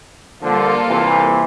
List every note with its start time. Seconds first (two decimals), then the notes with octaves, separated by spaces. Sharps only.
0.42 D3 F3 G3 A#3 F4 A4
0.88 C3 E3